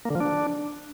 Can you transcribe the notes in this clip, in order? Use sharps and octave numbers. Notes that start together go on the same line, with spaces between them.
A#3
D3
F3
D4